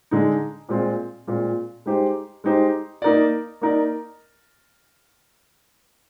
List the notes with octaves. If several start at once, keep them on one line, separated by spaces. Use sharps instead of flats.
D3 G#3 D#4
A#2 G#3 C4 F4
A#2 G#3 C4 F4
G#3 D#4 G4 C5
G#3 D#4 G4 C5
A#3 D#4 A#4 D5
A#3 D#4 A#4 D5